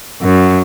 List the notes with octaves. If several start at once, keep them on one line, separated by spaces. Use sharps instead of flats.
F#2